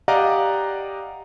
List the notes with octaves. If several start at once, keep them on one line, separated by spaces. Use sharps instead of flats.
G4 D5 D#5 F5 F#5 A#5